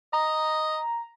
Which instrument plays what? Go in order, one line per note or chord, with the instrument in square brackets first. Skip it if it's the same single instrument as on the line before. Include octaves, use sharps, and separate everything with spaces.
[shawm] D#5 [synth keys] A#5